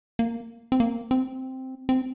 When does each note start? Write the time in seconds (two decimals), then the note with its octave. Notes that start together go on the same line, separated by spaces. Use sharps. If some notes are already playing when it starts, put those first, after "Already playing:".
0.19 A#3
0.72 C4
0.80 A#3
1.11 C4
1.89 C4